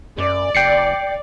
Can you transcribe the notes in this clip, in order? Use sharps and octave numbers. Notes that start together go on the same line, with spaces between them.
F#2 D5
F#1 G5 C7 C#7